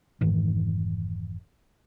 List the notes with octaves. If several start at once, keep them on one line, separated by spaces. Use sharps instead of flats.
F1 G#2 D#3 E3